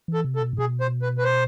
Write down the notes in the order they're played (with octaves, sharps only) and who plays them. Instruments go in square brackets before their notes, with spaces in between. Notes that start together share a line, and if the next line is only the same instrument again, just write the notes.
[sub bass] E3
[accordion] A4
[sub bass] C3
[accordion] A4
[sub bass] B2
A2
[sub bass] B2 [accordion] G#4
[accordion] C5
B4
B4
C5